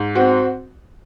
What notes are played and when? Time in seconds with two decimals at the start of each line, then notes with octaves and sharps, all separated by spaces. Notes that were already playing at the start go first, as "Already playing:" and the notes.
Already playing: G#2
0.15 C4 F#4